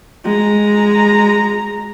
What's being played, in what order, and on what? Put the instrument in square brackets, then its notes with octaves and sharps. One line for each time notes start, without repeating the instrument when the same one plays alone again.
[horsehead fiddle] G#3 A#5